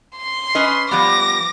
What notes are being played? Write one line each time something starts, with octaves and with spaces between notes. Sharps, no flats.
C6
C#4 B4 D#5
F3 G3 B3 D6 A#6